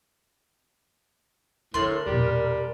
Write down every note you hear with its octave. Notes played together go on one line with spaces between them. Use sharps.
A2 D3 D4 A#4 C6
E1 A#2 G3